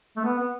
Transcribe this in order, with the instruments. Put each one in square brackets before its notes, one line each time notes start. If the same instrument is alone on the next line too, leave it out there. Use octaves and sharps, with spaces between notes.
[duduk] A3
B3
B3